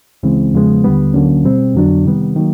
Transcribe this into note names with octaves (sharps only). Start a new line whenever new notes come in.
C#2 C#3 E3 G#3 C4
E2 C#3 F3 G#3 B3
D#2 D3 G3 B3
D2 D3 F#3 A#3 C#4
B2 G3 C4
F2 D3 F#3 B3 D4
C3 D#3 G3 B3
D#3 F#3 A#3